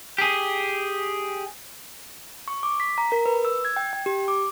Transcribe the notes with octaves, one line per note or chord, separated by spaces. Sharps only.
G4 G#4
C#6
D6
B6
A#5
A#4
B4
E6
G#6
G5
G5
G4
D6